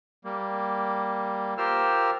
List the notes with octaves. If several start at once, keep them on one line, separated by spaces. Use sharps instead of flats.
G3 A#3
F4 G4 A#4 C5 E6 F6